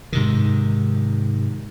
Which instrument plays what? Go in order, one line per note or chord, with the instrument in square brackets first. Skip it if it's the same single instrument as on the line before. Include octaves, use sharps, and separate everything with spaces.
[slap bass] G#2 C3 D#3